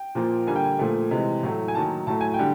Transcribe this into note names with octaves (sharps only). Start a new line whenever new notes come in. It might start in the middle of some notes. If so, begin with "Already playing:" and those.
Already playing: G5
A#2 F3 A#3
D3 G3 A#3 G#5
G5
G#5
A#2 F3 A3
C3 E3 G#3
A2 F#3 A3
G#5
D#3 F#3 A#3 A5
A2 F#3 A3 A5
G#5
G5
D3 G3